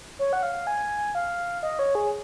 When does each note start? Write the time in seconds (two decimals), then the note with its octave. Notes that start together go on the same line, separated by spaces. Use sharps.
0.19 C#5
0.33 F#5
0.43 F5
0.67 G#5
1.15 F5
1.63 D#5
1.79 C#5
1.95 G#4